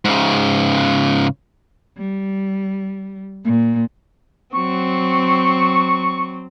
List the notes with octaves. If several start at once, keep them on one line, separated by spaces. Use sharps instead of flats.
G#2 C#3
G3
A#2
F#3 C4 C#6